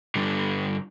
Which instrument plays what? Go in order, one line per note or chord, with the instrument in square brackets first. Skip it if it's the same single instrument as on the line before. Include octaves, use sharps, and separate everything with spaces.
[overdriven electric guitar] G2 D3